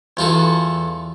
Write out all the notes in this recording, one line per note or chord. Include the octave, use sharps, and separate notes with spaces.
E2 F4 F#4 A4